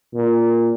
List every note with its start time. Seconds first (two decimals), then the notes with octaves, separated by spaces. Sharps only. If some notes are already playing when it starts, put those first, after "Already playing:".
0.15 A#2